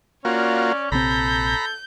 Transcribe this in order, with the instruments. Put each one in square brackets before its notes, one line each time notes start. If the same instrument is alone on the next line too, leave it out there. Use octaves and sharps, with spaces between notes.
[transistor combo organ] A#3 F4 F#4 [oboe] C#4 [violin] C#5 D5
[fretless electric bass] A#1 C3 C4 [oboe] A4 [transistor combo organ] A#5 B5 [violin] G6